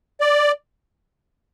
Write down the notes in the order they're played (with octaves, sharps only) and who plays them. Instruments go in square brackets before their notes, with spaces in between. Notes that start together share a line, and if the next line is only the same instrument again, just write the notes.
[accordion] D5